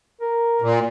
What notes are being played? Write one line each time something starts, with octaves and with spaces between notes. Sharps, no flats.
A#4
A#2